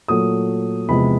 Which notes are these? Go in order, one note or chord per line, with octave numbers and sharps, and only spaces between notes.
A#2 F#3 A3 D#6
E2 C3 F3 G#3 B5